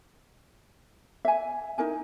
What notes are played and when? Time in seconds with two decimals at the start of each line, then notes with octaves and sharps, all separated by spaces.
1.25 E5 G#5
1.78 D#4 E4 A#4 G#5